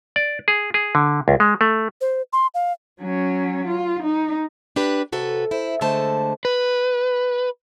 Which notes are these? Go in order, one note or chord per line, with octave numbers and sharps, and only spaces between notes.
D5
G#4
G#4
D3
C#2
G#3
A3
C5
C6
F5
F#3 C#4
F4
D#4
D4 G4 B4
C3 F#4 A4 B4
E4 C5
D3 G#3 A3 C5 A5
B4